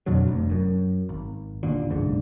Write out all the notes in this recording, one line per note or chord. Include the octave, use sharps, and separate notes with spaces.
F2 B2 D3 F#3
F1 D2
F#2
G#1
G1 D#2 A#2 D3
F#1 B1 G#2 D3